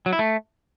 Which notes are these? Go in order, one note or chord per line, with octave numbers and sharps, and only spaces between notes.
F#3
E4
A3